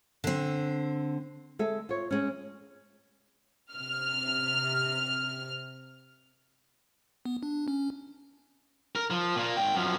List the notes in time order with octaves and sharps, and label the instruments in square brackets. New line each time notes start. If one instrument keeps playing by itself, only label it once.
[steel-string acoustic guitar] D3 C4
[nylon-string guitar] G#3 A4 E5
F4 C#5
G#3 C#4
[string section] C3 F6
[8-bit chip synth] B3
D4
C#4
[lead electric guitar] A#4
F3
A#2 A#3
G#2 G5
F#2 F3